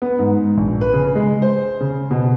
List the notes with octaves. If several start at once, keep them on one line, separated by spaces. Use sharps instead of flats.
B3
G#2
A#1
B4
C#3
G#3
C5
C#3
B2